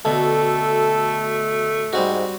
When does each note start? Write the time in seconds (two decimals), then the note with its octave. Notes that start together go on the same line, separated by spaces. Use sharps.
0.05 D2 B2 A3 A4
1.93 G#2 G3 C4 F#4